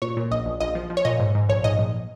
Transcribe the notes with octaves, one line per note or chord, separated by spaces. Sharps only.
A#2 C#5
A#2
A#1 D#5
A#1
A#1 D#5
F3
F3
C#5
A#2 D#5
G#2
G#2
A#1 C#5
G#2 D#5
A#1